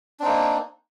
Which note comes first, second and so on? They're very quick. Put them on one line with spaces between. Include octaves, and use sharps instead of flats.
D4 C4 D#4 A#3